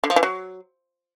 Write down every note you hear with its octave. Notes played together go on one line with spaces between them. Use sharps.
D3
F3
E3
F#3